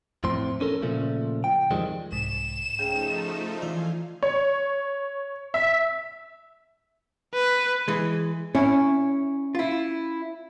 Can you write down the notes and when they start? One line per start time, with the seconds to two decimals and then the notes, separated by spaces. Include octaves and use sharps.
0.24 F2 A2 C4 C6
0.61 C#4 A4 A#4
0.82 A#2 C#3 F3 A3
1.44 G5
1.71 F2 D#3 F3 G3 G#3 C4
2.12 C2 G#2 E7
2.79 C#3 F3 A3 D#4 G5
3.61 E3 F4 D5 F5 G#5 C6
4.23 C#5
5.54 E5
7.34 B4
7.88 E3 G#3
8.55 C#4 E4
9.55 E4 F4